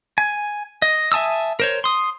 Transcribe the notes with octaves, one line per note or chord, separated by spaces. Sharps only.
G#5
D#5
E5 G#5 A5 D#6 E6
A#4 C5 C#5
C6 D#6